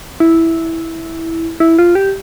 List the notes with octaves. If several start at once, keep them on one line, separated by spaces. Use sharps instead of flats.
E4
E4
F4
G4